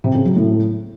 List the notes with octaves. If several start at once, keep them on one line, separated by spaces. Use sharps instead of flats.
C3
C#3
F#3
A2